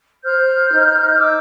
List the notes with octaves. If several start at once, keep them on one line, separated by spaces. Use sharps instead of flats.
C5 F6 G6
D#4
D#4 D6 E6